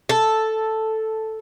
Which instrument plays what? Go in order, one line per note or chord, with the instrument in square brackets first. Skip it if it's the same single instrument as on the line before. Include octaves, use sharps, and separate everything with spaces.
[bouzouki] A4